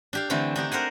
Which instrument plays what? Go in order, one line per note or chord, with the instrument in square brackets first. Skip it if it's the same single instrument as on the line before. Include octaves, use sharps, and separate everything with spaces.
[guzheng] D4 G4 F5
D3 E3 A3 C4 D4
D4 D#4 G4
A#4 C5 F#5 G#5